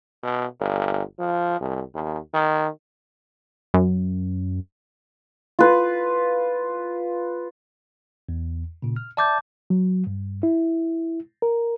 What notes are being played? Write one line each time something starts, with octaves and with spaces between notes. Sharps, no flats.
B2
G1
F3
C2
D#2
D#3
F#2
F4 B4
E2
A#2 C#3
F6
D5 E5 A5 D6 G6 A6
F#3
G2
E4
A#4